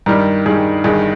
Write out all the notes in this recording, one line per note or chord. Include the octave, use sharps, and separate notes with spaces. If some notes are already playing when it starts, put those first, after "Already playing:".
G2 D#3 G3 A#4
G2 D#3 G3 G#4
G1 G2 D#3 G#4